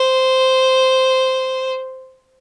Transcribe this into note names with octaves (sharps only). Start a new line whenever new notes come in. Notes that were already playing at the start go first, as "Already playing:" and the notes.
Already playing: C5